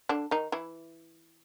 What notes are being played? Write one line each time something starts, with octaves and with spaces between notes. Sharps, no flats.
D3 D4
D#3 D#4
E3 E4